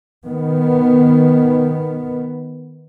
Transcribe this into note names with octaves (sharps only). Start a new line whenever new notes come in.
D#3 B3